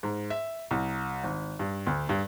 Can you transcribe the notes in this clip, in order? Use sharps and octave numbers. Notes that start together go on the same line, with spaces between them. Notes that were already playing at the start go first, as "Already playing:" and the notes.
G#2
E5
C2
G#1
G2
D2
G2